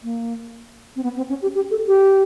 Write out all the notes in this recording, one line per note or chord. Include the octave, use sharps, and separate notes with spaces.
A#3
C4
B3
C4
C#4
G4
G4
A4
G4